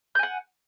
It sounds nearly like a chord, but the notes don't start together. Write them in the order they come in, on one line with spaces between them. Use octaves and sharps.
G6 G#5 F#5